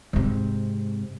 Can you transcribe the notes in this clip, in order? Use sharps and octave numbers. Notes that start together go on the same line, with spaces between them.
G#2 C3